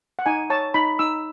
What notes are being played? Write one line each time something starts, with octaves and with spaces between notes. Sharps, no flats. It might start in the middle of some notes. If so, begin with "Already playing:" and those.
F#5
D#4 G#5
C#5 A5
D#4 B5
D#4 E6